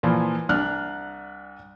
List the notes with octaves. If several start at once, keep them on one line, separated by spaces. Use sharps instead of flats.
A#2 E3 F3
C2 D4 F6 F#6